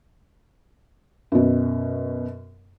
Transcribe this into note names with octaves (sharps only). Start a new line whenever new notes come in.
F#2 B2